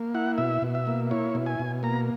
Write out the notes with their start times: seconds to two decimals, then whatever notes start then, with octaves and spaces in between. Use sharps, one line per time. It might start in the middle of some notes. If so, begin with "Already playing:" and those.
Already playing: A#3
0.15 E4 F#5
0.38 B2 E5
0.62 B2
0.75 E5
0.87 A#3
1.11 E4 C#5
1.35 B2
1.46 G#5
1.59 B2
1.83 A#3 A#5